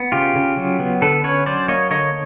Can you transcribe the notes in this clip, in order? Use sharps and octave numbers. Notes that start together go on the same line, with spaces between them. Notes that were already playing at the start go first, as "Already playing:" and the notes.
Already playing: B3
C#3 F4 G4
C#3
F#3
B3
D3 A4 B4
C#4 B4 C#5
F#3 C5 D5
A#3 C#5 D#5
D3 C#5 D#5